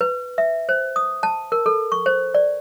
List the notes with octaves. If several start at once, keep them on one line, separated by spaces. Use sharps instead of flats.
B4
E5
C5
D#6
A5
A#4
A4
C#6
C5
D5